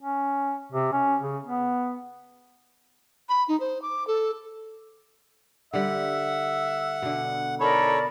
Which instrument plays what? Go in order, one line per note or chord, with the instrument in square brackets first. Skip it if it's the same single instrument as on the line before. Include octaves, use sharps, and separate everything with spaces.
[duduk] C#4
C3
C#4
C#3
B3
[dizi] B5
D#4
C5
D6
A4
[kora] D3 G3 [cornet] E5 [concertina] F#5
[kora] B2 D3
[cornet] D#4 [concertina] A4 C#5 [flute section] A#4 D5 B5